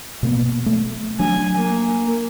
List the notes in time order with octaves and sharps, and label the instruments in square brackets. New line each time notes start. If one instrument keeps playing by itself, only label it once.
[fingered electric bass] B2 A#3 B3
A3
[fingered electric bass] F#3 D4 [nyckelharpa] G#5
[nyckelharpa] A#3